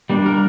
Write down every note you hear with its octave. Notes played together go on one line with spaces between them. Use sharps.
G3 A#3 D4
A#4